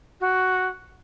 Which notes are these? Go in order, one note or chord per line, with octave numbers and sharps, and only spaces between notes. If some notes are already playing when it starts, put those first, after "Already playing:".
F#4